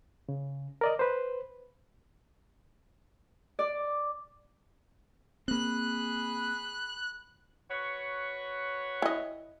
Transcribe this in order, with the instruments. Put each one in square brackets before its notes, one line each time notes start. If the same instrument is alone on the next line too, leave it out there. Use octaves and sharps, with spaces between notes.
[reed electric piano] C#3
A#4 D5 D#5
B4 C5
[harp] D5
[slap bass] A#3 C4 [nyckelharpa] G#4 B5 [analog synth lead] F#6
[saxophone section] F#4 B4 C#5
[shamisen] E4 D#5